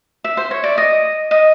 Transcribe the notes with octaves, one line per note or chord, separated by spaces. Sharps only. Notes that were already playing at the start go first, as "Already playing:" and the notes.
E5
C5
C#5
D5
D#5
D#5